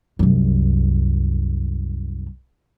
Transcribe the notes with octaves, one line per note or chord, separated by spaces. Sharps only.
C2 F#2